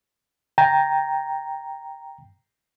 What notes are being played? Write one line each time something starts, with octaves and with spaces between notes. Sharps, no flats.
G5 A#5